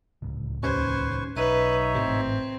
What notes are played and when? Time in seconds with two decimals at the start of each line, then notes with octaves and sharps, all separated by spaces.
0.22 D1 C#2
0.63 D#2 C#4 B4 C5 C#6 G#6
1.36 B1 D#4 B4 C#5 E5 D#7
1.94 G#1 A2 C3 C4